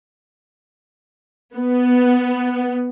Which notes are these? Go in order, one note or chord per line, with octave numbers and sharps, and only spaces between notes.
B3